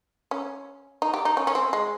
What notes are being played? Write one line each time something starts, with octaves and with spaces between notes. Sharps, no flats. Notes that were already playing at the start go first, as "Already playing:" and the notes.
C#4
D#4
G4
D#4
C#4
C#4
C4
G#3